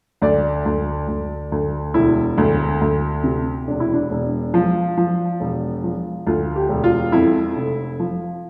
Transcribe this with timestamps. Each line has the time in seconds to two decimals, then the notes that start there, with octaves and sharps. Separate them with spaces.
0.22 D2 D5
0.65 D2
1.08 D2
1.52 D2
1.94 E1 E4
2.38 D2
2.81 D2
3.24 C3
3.68 E1 D4
3.80 E4
3.93 D4
4.11 E1
4.54 F3
4.97 F3
5.40 E1
5.84 F3
6.26 D2 F4
6.56 G4
6.69 E1
6.84 F4
7.12 F2 E4
7.56 F1
8.00 F3